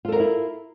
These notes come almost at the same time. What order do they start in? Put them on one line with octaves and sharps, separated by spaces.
F4 A4 A#4 F5 E4